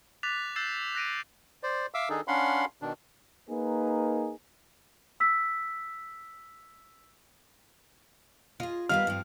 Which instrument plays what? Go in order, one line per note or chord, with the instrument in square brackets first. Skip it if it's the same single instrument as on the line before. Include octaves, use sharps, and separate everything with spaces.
[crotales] D6 F#6 A6 B6 F7
E6 F#6 G6 A6 C7 E7
F#6 A#6 D7 D#7
[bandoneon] C5 D5
E5 F5 D6 E6
D#3 D4 D#4 G#4 A4
C#4 D4 F5 F#5 B5 C6
B2 D#3 D4
[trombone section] A#3 D#4 G#4 A#4 B4
[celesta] E6 B6
[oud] F4 [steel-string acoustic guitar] G#4 D#5
[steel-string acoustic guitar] D#3 G3 B3 [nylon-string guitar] D#5 F5 [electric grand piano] F6
[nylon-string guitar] G2 [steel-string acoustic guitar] F3 C4